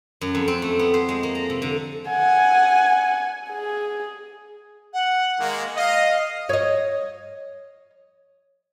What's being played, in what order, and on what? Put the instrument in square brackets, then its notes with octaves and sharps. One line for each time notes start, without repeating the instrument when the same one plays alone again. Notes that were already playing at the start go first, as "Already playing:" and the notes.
[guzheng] F#2
F2
C4
A3
B3
C5
G#3
A#3
A#5
C3
D3
[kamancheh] F#5 G#5
G#4
[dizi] F#5
[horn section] D#3 G#3 A#3
[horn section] D#5 [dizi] F5
[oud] C#5 D#5